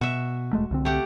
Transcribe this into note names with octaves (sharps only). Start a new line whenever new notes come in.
B2 F#4 E5
E1 G#3 A3
C2 D3 C4
A3 G4 F#5